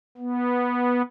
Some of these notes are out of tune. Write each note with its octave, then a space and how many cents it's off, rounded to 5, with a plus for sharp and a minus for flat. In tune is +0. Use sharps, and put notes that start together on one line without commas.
B3 -10